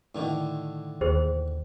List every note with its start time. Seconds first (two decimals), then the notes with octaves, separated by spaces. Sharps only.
0.15 A2 D3 D#3
1.01 D#2 G#4 C5